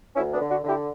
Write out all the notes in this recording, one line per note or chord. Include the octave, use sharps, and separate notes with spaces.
D2 C#4 E4
B3 D4
D3
D4 F#4
D3
E4 G4